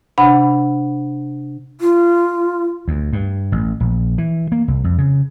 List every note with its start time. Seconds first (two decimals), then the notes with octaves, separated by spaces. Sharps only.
0.18 C3 D4 F#5 B5
1.81 F4
2.88 D2
3.13 G2
3.52 A1
3.80 A#1
4.18 E3
4.52 A#3
4.68 C2
4.84 F2
4.98 C#3